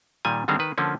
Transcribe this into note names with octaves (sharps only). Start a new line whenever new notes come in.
A#2 D#3 G3 G#5
D3 D#3 G3 G#3 C4 D4
D#3 B4
D3 F3 A#3 C#4